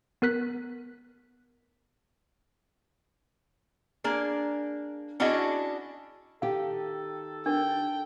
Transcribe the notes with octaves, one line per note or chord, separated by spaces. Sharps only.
B3 A#4 F#6 B6
A#3 D4 G#4
C#4 D4 E4 F#4 G#4 D#5
D#3 G4 A4 F5
D4 A#4 G5